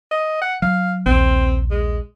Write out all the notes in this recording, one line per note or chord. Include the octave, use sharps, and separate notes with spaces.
D#5
F#5
F#3 F5
A#1 D#2 C4
G#3